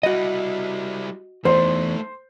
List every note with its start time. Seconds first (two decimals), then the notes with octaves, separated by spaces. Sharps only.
0.03 G3 E4 F#4 D#5
1.45 E2 A3 D#4 C5